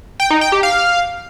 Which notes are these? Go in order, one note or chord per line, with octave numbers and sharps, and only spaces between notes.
G5
D#4
G5
G4
F5